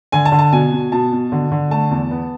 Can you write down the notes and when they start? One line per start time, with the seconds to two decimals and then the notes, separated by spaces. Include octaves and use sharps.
0.12 D3 G#5
0.25 A5
0.32 D3
0.39 A5
0.52 B2 G#5
0.72 B2
0.92 B2 A5
1.12 B2
1.32 D3
1.51 D3
1.71 A3 A5
1.91 E2
2.11 B3